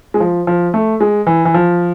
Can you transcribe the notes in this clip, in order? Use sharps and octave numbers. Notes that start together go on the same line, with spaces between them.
G#3
F3
F3
A3
G#3
E3
E3
F3